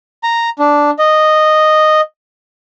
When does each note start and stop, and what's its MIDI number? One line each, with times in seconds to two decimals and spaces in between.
0.23 0.49 82
0.59 0.91 62
0.99 2.01 75